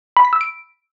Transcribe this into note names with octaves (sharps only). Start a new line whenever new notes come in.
B5
B6
E6
D7